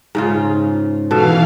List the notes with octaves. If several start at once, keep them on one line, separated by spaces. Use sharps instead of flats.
G#2 C#3 F4
B2 E3 A4 F5